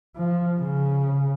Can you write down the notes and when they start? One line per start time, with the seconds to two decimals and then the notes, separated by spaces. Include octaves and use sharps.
0.16 F3
0.60 C#3